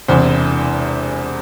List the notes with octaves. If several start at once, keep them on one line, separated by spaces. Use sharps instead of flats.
E1 E2 C3 E3 C5